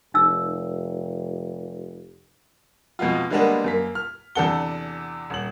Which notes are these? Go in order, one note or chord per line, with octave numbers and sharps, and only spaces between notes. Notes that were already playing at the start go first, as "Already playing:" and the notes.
F1 D#4 E6
F2 B2 G#3 B3 F4
D3 G3 G#3 A#3 B3 D4
F#2 A#3 B6
F6
E2 C3 D4 A4 F#5 G7
D#1 F#7